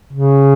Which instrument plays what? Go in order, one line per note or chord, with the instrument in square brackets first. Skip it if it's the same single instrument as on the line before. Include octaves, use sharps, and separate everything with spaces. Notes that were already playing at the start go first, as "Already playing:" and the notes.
[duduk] C#3